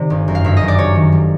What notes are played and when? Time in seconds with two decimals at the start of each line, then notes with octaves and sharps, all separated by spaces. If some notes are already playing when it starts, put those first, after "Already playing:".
Already playing: C3 D#3 D5
0.10 G1
0.28 F#2
0.35 F5
0.44 G1 E5
0.57 F#2 D#5
0.68 D5
0.78 C3 C#5
0.95 D#3
1.12 G3